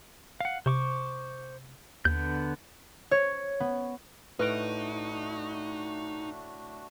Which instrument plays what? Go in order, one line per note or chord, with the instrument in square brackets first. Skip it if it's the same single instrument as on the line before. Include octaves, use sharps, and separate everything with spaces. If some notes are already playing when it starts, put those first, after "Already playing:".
[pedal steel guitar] F5 F#5
[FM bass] C3 [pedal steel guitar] C5 C#6 D6
[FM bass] D#2 [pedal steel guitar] D3 B3 G6
[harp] C#5
B3
[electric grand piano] A2 F#6 D7 [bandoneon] A3 D4 F#4 [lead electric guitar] D#4 [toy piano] B4